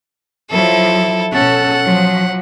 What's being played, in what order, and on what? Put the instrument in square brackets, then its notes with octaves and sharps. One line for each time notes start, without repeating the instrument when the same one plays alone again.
[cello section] F3 F#3 [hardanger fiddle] E4 A4
[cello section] B2 C#4 A4 [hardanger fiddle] F#5
[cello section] F3 F#3